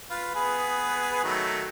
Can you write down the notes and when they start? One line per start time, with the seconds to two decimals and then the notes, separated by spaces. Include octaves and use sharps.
0.10 F4 B4
0.35 B3 G#4 B4
1.24 D#3 F#3 A3